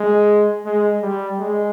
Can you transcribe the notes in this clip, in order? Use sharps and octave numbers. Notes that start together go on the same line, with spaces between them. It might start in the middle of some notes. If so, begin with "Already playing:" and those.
Already playing: G#3
G#3
G3
G#3